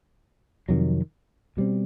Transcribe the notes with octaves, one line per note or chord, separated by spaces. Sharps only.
F2 C3 D#3 F#3
B2 G3 C4